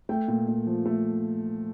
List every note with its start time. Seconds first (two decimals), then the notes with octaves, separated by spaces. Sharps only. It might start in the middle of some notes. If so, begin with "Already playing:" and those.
0.09 A3 G5
0.28 A#2
0.48 A#2
0.67 F3
0.86 A3